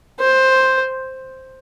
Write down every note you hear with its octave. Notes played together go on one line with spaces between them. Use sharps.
C5